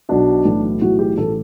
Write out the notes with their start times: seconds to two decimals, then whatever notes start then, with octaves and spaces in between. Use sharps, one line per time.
0.09 B1 B2 D4
0.45 B1 A2 E3
0.81 B1 A2 E3 F#4
0.99 G4
1.18 A1 A2 E3 A4